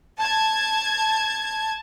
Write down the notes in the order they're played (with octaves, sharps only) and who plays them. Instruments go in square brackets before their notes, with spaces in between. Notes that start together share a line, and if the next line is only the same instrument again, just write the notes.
[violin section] A5 G#6